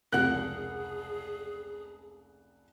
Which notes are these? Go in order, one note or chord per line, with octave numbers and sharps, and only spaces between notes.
F1 C#2 G#4 A#4 F#5 F#6